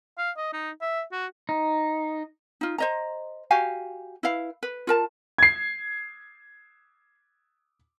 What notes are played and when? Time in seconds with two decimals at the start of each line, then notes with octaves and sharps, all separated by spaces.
0.18 F5
0.37 D#5
0.53 D#4
0.81 E5
1.12 F#4
1.49 D#4
2.61 D#4 F4
2.78 C5 D#5 A#5
3.51 F#4 G4 F5 G#5
4.23 E4 B4 F5
4.63 B4
4.87 F4 A#4 A5
5.38 G#6 C7